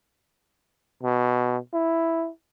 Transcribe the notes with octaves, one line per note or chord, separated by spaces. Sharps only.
B2
E4